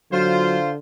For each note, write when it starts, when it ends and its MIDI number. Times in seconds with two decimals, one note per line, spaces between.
0.12 0.78 50
0.12 0.57 54
0.12 0.70 65
0.12 0.70 72